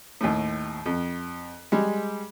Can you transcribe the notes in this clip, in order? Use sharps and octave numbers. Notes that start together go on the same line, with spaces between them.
D#2 A2
F2
G3 G#3